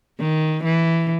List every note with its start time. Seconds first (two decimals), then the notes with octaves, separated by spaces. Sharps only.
0.19 D#3
0.64 E3